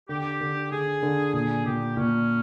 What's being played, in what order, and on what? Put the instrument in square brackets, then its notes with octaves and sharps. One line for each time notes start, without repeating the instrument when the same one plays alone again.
[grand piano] D3 [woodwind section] G4
[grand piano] D3
[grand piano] D3 [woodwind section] G#4
[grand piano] D3
[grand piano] A#2 [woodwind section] G#4
[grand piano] A#2 [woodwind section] G4
[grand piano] A#2 [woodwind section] C#4